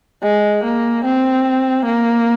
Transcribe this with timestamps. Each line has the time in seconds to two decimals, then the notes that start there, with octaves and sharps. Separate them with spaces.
0.22 G#3
0.64 A#3
1.05 C4
1.86 A#3